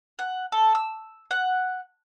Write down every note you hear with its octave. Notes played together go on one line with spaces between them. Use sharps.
F#5
A4
E6
F#5